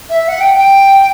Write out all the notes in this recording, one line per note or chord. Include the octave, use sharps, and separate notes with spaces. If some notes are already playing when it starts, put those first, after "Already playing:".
E5
F#5
G5
G5